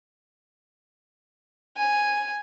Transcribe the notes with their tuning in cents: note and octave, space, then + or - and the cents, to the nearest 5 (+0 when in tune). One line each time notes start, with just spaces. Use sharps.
G#5 +0